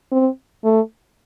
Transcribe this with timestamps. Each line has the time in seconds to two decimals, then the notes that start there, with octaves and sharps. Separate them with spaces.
0.12 C4
0.64 A3